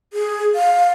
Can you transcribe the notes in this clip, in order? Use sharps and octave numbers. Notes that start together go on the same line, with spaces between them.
G#4
F5